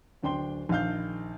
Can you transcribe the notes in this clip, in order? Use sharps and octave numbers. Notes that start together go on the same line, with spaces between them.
D1 D4 G5 C6 G7
A#1 D#3 F5 G6